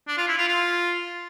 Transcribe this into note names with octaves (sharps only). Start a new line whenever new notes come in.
D4
F4
E4
F4
F4